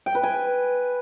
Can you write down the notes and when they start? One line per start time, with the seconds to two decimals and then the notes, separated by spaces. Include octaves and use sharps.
0.06 G5
0.15 B4
0.23 G#5